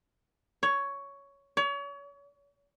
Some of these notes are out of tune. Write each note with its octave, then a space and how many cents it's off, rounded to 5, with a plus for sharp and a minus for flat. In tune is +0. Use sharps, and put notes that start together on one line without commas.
C#5 +10
C#5 +35